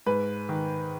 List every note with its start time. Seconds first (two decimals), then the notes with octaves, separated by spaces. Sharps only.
0.06 G#2 B4
0.49 D#3